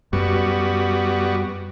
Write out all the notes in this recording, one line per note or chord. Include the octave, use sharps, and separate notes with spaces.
F#2 G3 B3 F#4